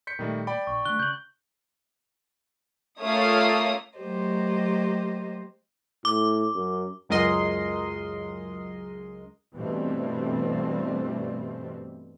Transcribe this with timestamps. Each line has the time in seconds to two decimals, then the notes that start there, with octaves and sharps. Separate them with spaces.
0.07 G6 B6 C#7
0.19 A#2 D#3 G3 A3
0.47 D5 G5 B5
0.67 A#1 C#6
0.85 D3 A3 F#6 G7
0.99 C#3 G6 F#7
3.01 A3 A#3 C#4 F4 C#5 F5 D#6
3.99 F#3 A3 A#3 G4 C5 D#5
6.05 A2 D6
6.55 F#2
7.09 C#2 F#2 G#3 A#4 D#5 C6
9.54 G2 B2 E3 G3 A3 C4